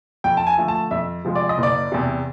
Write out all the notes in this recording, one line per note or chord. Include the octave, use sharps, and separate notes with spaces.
F2 G5
A5
G#5
D3 F3 A3
A5
F2 E5
C3 F3 G#3
D5
D#5
F#1
D5
E2 C3